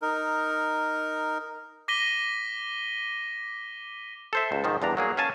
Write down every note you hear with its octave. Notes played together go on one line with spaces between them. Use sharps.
D#4 A#4
D6 A#6 B6 D#7 G7
A4 C5 E5
C#2
G#2 D#3 F3
E2 G2 D4 A#5
F#3 A#3 G#4
C#4 F5 G#5 A5